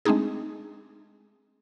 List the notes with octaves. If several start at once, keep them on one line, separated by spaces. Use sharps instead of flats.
G#3 A3 C4 D4 D#4 G#4